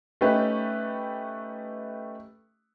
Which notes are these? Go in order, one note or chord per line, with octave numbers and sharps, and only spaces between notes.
A3 C#4 D#4 G4 B4